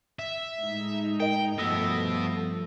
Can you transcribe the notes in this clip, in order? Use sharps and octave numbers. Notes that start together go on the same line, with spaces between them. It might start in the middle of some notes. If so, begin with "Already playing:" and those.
E5
A2 G#3 D#4
A#4 D#5 G5 D7
G2 B2 F3 A3 B3 D#6 E6 A#6